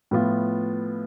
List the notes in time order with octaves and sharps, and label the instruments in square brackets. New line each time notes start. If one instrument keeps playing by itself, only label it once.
[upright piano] A2 F3 B3 F4